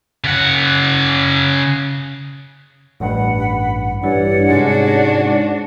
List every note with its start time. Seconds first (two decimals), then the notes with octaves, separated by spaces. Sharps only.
0.24 C#3 F#5
3.00 A1 G2 F#5 B5
4.03 G2 E3 C#5 D5 F#5
4.49 G#2 C3 G#3 C#4 D4 F#4